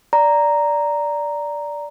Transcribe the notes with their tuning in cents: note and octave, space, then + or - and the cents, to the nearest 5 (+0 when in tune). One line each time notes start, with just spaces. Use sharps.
D5 -5 A#5 +0